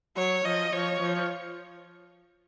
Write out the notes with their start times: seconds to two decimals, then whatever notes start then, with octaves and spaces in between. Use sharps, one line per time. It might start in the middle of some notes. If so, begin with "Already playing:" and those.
0.16 F#3 C#5
0.45 F3 D#5
0.73 F3 C#5
1.00 F3